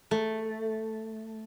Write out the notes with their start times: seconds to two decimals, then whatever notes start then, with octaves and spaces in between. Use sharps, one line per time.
0.11 A3